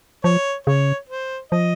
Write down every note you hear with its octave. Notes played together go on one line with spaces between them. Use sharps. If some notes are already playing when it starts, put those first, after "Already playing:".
F3 C#5
C#3 C#5
C5
F3 D#5